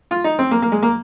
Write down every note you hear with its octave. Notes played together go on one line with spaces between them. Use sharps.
F4
D#4
C4
A#3
A#3
G#3
A#3